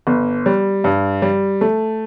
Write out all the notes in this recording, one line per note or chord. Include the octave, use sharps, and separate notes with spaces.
G1
G3
G2
G3
A3